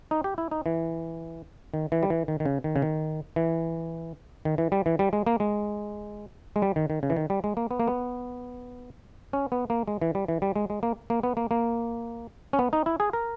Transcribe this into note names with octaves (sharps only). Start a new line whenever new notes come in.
D#4
G4
E4
D#4
E3
D#3
E3
G3
E3
D#3
D#3
C#3
D#3
C#3
D#3
E3
D#3
E3
G3
E3
G3
G#3
A#3
G#3
G#3
G3
D#3
D#3
C#3
E3
D#3
G3
G#3
A#3
B3
A#3
B3
C#4
B3
A#3
G#3
E3
G3
E3
G3
G#3
G#3
A#3
A#3
B3
A#3
A#3
C#4
B3
D#4
E4
G#4
A#4